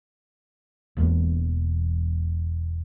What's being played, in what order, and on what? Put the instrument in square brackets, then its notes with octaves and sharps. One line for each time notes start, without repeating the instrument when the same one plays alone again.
[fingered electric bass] E1 E2 A#3